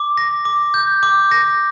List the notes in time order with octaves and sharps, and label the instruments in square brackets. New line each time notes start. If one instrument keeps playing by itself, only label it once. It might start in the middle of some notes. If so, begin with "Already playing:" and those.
Already playing: [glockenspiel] D6
A#6
D6
G6
D6
A#6